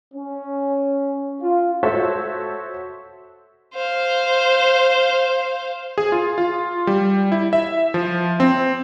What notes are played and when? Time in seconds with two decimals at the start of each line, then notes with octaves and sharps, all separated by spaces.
0.14 C#4
1.41 F4
1.83 F#4 A4 C5 C#5 E5
3.75 C5 F5
5.98 G#4
6.12 F4
6.38 F4
6.87 G3
7.32 E4
7.53 E5
7.94 F3
8.40 C4